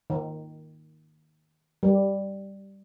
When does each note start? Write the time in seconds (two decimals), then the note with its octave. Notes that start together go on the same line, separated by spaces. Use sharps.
0.10 D#3
1.83 G3